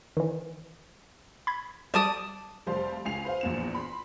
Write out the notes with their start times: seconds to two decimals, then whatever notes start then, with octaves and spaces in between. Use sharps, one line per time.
0.17 D#3 E3
1.47 B5 G#6
1.94 F#3 G3 D5 A5 D#6
2.67 F1 G3 C5 F5 A5 C6
3.05 C#2 G#5 C7 F7
3.24 B4 C5 F5
3.41 A#1 E2 E7
3.75 B5 C6